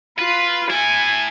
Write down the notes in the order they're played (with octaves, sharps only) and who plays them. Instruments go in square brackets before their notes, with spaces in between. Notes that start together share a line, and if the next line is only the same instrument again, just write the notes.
[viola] F4 [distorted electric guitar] B4
[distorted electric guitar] E4 A4 [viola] G#5